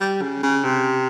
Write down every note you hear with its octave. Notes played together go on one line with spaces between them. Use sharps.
G3
C#3
C#3
C3